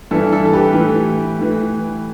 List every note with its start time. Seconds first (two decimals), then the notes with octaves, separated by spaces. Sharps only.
0.11 G2 E3 E4 A4
0.32 E4 A4
0.45 A4
0.53 G4 B4
0.74 A2 E3
1.38 A2 E3